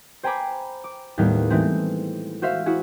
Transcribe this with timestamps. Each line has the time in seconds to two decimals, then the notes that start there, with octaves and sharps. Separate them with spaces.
0.23 C5 G5 G#5 A#5 B5 D6
0.84 D6
1.18 D#2 A2 G3 B3
1.50 E3 G#3 A3 C4
2.42 F#4 C5 E5 F5
2.66 E4 F#4 G#4